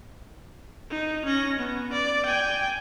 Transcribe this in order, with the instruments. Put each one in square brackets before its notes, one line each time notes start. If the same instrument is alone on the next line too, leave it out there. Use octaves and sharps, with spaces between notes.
[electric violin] D#4
C#4 A#6
B3
D5
G5 G#5